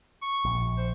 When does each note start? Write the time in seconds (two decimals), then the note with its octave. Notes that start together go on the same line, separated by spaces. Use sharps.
0.22 C#6
0.45 A#1
0.78 C5